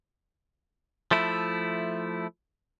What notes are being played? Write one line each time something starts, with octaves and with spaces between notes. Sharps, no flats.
F3 A3 E4